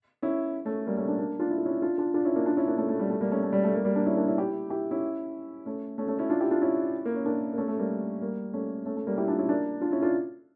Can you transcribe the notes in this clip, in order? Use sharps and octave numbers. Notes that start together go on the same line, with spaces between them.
C#4 E4
A3 C#4
G3 A#3
A3 C#4
A#3 D4
A#3 D4
D4 F4
E4
F4
C#4 E4
D4 F4
D4 F4
D4 F4
C#4 E4
A#3 D4
D4 F4
C#4 E4
A#3 D4
A3 C#4
A3
G3
A3
G3 A#3
A3 C#4
A3
G3
A3
G3 A#3
G3 A#3
A#3 D4
C#4 E4
A#3 D4
C#4 E4
E4 G4
E4 G4
C#4 E4
A3 C#4
A3 C#4
A3 C#4
C#4 E4
D4 F4
E4 G4
D4 F4
C#4 E4
A#3
C#4
A#3 D4
A#3
A3 C#4
A3
G3 A#3
G3 A#3
A3 C#4
A3 C#4
A3
G3 A#3
E4 G4
D4 F4
C#4 E4
A#3 D4
D4 F4
C#4 E4
D4 F4